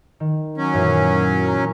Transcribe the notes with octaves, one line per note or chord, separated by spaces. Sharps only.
D#3
F#3 C#4
F#2 A#2 E3
A#5 F6